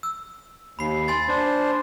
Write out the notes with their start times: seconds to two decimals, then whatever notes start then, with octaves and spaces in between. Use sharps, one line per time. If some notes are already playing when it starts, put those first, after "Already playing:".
0.03 E6
0.79 D#2 B5 C7
1.08 G#5 C6 A6
1.29 D4 C5